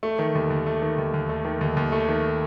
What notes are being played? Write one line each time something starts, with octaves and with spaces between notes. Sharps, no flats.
A3
D#3
D#2
D#2
A3
D#3
D#2
D#2
A3
D#3
D#2
D#2
A3
D#3